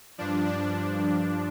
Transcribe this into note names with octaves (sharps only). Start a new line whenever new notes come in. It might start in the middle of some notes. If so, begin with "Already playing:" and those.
G2 F3 D4
D4